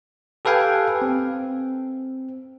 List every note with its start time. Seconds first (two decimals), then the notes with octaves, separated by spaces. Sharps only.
0.45 G4 A4 B4 F5 G5 G#5
1.02 C4